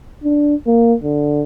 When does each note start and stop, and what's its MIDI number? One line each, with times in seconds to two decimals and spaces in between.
0.24 0.55 62
0.67 0.94 58
1.03 1.42 50